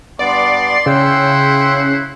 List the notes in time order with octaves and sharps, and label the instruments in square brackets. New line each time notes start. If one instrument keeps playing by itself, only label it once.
[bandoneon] G2 B3 D6 [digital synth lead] D5 [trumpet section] C6
[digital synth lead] C#3 [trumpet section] E4 C5 F#5 [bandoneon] G5 C6 E6